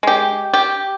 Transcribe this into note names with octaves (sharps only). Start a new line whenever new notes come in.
G#3 G4
G4